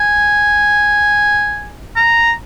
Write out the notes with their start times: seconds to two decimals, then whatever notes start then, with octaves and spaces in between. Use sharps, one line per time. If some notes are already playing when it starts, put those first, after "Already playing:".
Already playing: G#5
1.96 A#5